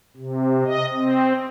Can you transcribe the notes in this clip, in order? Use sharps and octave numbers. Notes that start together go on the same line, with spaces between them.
C3
D#5
C4